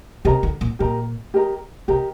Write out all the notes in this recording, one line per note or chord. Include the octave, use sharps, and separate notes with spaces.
C3 G4 A#4 D#5 A#5
D3
A#2
A#2 G4 A#4 D#5 A#5
G4 A#4 D#5 A#5
C3 G4 A#4 D#5 A#5